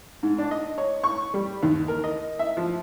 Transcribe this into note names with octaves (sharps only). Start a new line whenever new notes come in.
G#2
D4
D#5
C#5
C#6
G3
D#2
A#4
D#5
E5
F3